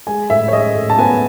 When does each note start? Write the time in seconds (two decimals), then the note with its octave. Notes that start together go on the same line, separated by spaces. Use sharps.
0.07 G#3 G#5
0.30 A2 E5
0.48 C#5
0.53 G#3 D#5
0.75 A2
0.90 A5
0.98 B3 G#5